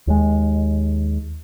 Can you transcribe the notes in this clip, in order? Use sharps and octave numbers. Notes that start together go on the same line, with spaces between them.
D#2 G#3